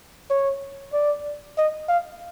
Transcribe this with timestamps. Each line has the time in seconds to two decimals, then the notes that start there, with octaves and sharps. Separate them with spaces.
0.30 C#5
0.93 D5
1.58 D#5
1.89 F5